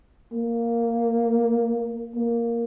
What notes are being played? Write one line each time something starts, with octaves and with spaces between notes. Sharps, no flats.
A#3
A#3